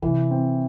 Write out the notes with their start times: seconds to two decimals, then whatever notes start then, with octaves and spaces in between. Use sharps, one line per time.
0.02 C3 E3
0.31 C4